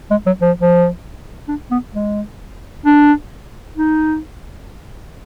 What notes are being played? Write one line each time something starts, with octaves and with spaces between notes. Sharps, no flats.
G#3
F#3
F3
F3
D4
B3
G#3
D4
D#4